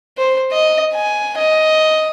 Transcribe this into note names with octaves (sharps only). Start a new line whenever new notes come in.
C5
D#5
G#5
D#5